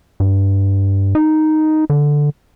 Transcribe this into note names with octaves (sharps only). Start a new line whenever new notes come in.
G2
D#4
D3